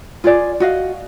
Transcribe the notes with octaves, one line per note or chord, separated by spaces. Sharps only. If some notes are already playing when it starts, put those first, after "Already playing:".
F4 G#4 D5
F#4 D#5 F5